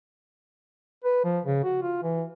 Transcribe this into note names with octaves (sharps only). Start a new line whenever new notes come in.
B4
F3
C#3
F#4
F4
E3